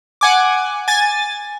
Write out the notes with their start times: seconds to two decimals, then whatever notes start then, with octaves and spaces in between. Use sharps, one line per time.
0.21 F#5 G#5 D6
0.88 G#5 A6